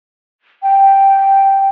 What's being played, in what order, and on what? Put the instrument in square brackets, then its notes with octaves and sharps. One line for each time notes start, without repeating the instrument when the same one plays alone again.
[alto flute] G5